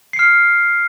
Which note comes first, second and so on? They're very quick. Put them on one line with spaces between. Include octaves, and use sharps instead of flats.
C7 C#7 F6